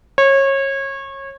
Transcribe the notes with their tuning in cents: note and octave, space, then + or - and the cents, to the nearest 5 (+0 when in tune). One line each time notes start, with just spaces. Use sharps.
C#5 -25